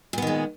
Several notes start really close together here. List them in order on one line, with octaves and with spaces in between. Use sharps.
A#2 B3 D#3 G#3